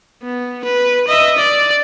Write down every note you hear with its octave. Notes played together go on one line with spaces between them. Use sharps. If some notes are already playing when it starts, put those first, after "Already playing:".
B3
B4
D#5 E5
D5